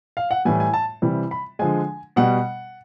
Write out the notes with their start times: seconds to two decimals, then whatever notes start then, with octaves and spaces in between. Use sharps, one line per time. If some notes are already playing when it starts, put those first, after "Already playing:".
0.17 F5
0.31 F#5
0.45 A2 E3 G3 G#5
0.60 G#5
0.74 A5
1.02 C3 E3 G3
1.31 B5
1.59 D3 F3 G#3 G#5
2.16 B2 G3 F#5